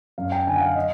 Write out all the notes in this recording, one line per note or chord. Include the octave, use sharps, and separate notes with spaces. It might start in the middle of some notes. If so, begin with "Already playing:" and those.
F#2 F5
G5
D3 G#5
F#5
F5
D#5